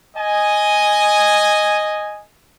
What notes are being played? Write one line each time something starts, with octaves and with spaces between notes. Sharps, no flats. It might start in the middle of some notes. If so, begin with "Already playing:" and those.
D#5 G#5